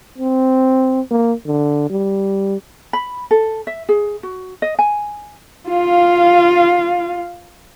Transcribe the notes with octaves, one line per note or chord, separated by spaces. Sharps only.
C4
A#3
D3
G3
B5
A4
E5
G#4
F#4
D#5
G#5
F4 F5